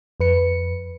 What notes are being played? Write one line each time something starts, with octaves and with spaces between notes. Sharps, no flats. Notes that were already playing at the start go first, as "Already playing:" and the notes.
F2 B4 C#7